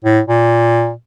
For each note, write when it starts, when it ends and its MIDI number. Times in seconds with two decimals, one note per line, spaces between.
0.05 0.20 45
0.27 0.92 46